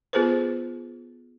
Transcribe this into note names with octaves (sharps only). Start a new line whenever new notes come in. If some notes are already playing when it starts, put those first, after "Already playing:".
B3 F4 G#4 A4 B4 C5